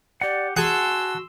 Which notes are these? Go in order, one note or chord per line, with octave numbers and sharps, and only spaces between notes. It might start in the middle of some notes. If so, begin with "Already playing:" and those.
G4 D5 F#5
F#4 G#4 F#5 A5 C6 E6